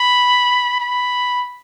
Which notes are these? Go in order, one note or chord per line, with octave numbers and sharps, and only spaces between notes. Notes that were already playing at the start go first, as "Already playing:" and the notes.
Already playing: B5
B5